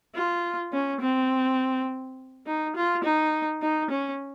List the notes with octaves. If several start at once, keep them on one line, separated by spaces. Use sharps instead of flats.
F4
C#4
C4
D#4
F4
D#4
D#4
C#4